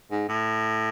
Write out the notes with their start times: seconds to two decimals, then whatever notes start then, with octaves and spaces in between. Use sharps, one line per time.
0.11 G#2
0.29 A2